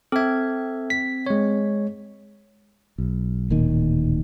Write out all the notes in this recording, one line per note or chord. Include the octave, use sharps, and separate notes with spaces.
C4 A4 E5 G#6
B6
G#3 C#5
B1
D1 A#2 D#3